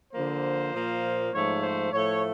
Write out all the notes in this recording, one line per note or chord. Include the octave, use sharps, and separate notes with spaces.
D3 F3 A#3 C5
A#2 F3 A#3
G#2 F3 A3 C#5
C5
A2 F3 A3 C#5